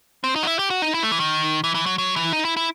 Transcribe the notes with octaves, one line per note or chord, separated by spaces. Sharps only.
C4
D#4
F#4
E4
G4
F#4
D#4
E4
A3
E3
D#3
E3
E3
F#3
F#3
E3
D#4
E4
E4